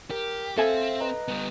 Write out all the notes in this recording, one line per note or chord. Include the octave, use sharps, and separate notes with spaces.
G4 A#4
C4 A4 E5 F5 G#5
B4 D#5 A#5
G3 B3